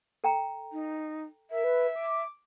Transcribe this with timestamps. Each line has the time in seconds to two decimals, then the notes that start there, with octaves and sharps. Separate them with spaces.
0.24 A4 G5 A#5
0.73 D#4
1.51 A#4 E5
1.64 B4
1.96 D6